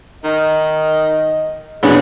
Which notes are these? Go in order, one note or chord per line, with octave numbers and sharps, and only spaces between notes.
D#3 D#5
A#1 E2 B2 B3 C#4 D4 G#4 C#5